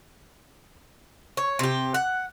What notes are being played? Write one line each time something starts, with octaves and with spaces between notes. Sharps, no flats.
C#5
C3 G4
F#5